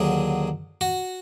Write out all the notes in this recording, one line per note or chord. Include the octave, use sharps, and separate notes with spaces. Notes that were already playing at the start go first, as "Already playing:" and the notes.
Already playing: D#2 D3 F#3 G#4
F#4